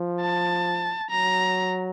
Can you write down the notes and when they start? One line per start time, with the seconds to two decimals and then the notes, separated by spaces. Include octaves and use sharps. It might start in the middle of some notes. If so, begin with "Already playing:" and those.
Already playing: F3
0.21 A5
1.10 F#3 A#5